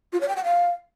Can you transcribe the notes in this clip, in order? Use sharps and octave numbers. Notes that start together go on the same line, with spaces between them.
F4
C#5
G5
F#5
F5